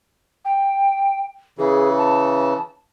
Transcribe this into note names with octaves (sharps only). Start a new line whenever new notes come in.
G5
C#3 E3 G#4
A5